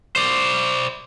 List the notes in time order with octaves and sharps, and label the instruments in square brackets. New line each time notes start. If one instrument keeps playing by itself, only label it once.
[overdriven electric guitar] C5 D5